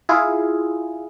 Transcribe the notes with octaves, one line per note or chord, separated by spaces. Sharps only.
E4 F4 G#4